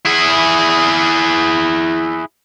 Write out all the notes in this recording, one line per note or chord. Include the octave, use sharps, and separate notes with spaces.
E4 G#4